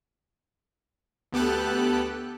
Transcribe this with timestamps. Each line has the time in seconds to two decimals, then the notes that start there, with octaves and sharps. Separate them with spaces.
1.32 D2 B3 G4 A4 F#6